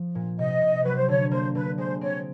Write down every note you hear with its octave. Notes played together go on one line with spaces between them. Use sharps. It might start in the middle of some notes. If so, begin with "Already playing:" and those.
Already playing: F3
A#2
C3 D#5
C3
F#3 B4
C5
D3 C#5
A#3 C5
D3 B4
G#3 C5
C4 C#5